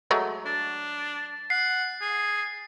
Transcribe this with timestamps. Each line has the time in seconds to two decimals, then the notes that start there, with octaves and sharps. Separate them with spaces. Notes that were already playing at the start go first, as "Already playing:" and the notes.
0.11 F#3 G#3 A3
0.46 D4 A6
1.50 F#5 C7
2.01 G#4